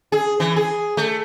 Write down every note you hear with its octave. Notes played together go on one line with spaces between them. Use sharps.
G#4
E3
G#4
A3